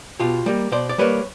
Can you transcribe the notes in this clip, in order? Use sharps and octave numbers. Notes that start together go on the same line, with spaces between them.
B2 F4 G4
G3 A#3
B2 C5 D5
D5
G3 A#3 B4 C#5